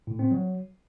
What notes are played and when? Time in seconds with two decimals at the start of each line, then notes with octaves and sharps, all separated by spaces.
0.07 A2
0.19 C4
0.31 F#3